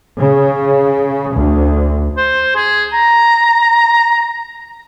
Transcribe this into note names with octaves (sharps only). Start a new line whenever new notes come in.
C#3
D2
C5
G#4
A#5